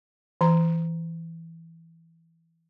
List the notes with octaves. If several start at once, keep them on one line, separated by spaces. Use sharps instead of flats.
E3 A#5